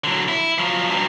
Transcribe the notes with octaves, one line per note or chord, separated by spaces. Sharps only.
D3 F#3
E4
F3 F#3
G2 F#3